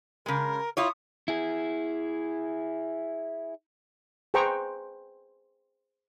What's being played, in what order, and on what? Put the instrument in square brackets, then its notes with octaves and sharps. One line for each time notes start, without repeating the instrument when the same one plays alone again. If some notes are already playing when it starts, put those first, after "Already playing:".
[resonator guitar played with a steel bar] C#3 G#3 [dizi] A#4
[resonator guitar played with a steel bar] E4 F4 C#5 [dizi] D#6
[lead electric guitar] E4 G#4
[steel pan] G#4 B4 C5 G5 A#5 C#6